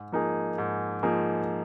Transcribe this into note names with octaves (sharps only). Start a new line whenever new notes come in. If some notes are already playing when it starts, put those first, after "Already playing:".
Already playing: G#2
F3 A#3 D#4 G#4
G#2
F3 A#3 D#4 G#4